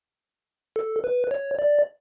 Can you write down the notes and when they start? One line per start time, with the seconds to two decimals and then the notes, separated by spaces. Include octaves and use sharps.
0.76 A4
1.04 B4
1.31 C#5
1.59 D5